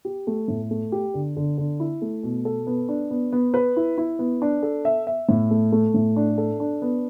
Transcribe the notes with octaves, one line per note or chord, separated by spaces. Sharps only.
G4
A3
A2
A3
G4
D3
D3
D3
E4
A3
B2
A4
B3
D4
B3
B3
B4
E4
E4
B3
D4
A4
E5
E5
A2
A3
A3
A2
D4
A4
D4
B3